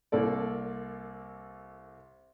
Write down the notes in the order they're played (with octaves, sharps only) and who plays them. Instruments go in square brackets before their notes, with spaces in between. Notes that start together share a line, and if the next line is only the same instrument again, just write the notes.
[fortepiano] C2 A#3 A4 D5